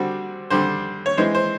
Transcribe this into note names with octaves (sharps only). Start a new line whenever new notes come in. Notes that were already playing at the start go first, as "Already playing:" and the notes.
Already playing: D3 G3 C4 F#4
D3 G3 C4 C5
C#5
E3 G#3 C4 C5
C5